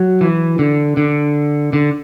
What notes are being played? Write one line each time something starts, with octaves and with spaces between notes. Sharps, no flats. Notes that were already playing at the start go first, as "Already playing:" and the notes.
Already playing: F#3
E3
D3
D3
D3